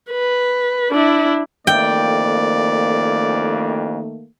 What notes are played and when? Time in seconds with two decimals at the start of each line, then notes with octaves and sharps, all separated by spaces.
0.12 B4
0.91 D4 E4
1.67 A1 F2 D#3 A3 A#3 D5 G5